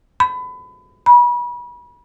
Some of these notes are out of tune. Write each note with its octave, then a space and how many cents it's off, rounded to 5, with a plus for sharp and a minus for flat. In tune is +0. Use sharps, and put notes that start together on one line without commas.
B5 +25
B5 -35